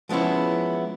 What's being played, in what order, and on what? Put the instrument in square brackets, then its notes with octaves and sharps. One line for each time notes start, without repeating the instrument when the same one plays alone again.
[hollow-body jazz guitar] F3 G#3 B3 C#4 E4